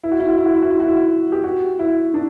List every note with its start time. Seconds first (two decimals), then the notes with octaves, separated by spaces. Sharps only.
0.03 E4
0.11 F#4
0.20 E4
0.28 F#4
0.37 E4
0.45 F#4
0.54 E4
0.62 F#4
0.70 E4
0.80 F#4
0.88 E4
1.32 G4
1.44 F#4
1.79 E4
2.14 D4